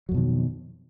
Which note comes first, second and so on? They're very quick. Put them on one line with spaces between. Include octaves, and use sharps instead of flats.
F#3 F2 B2 D#3